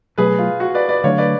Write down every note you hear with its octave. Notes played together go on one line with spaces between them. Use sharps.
B2 F#3 A3 G#4 B4
F4
F#4
B4 D5
B4 D5
D3 F#3 A3 D4 C#5 F5
B4 D5